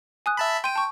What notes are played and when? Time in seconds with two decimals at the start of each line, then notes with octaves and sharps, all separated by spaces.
0.26 G#5 D#6 F#6
0.37 E5 A5 B5
0.64 G5 C6 D#7
0.76 A5 C#6